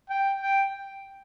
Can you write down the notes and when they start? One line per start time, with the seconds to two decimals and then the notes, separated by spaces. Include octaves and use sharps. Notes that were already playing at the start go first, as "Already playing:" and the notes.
0.10 G5
0.41 G5